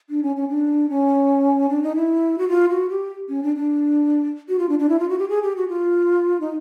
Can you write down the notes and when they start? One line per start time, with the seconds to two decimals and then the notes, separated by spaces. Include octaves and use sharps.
0.10 D4
0.23 C#4
0.36 C#4
0.49 D4
0.90 C#4
1.69 D4
1.83 D#4
1.96 E4
2.38 F#4
2.49 F4
2.70 F#4
2.90 G4
3.29 C#4
3.43 D4
3.56 D4
4.49 F#4
4.59 F4
4.69 D4
4.79 D4
4.89 E4
4.99 F4
5.09 F#4
5.19 G4
5.29 G#4
5.42 G4
5.56 F#4
5.68 F4
6.40 D#4